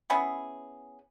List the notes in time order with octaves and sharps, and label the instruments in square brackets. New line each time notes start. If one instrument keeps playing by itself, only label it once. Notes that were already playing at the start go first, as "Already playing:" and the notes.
[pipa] B3 C#4 E4 G#4